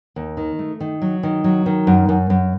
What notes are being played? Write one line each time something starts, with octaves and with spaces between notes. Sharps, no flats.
D#2
D#3
A3
D#3
F#3
D#3
F#3
D#3
F#2
F#2
F#2